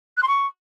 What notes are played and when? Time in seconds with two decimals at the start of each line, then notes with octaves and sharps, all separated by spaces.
0.17 F#6
0.23 C6
0.28 C#6